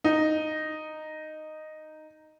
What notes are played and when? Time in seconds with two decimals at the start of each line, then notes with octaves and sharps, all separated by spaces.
0.04 D#4